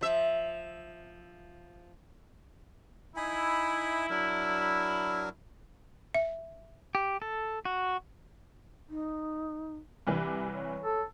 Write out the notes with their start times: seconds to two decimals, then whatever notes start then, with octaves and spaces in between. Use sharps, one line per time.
0.01 F3 E5
3.16 D#4 E4 G#5 B5
4.10 F#3 D4 A#4
6.14 E5
6.95 G4
7.22 A4
7.65 F#4
8.89 D#4
10.07 C2 E3 G4 B4
10.53 C#5
10.83 A4